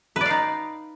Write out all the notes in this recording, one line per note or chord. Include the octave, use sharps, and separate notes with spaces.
D#4 B4 D5 F5